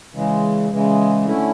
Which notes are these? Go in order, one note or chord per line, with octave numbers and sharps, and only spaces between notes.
C#3 E3 G#3
C#3 E3 G#3
D3 A3 C#4 E4